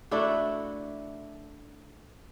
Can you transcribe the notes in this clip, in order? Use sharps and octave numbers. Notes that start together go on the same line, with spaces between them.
A3 D4 E4 F#4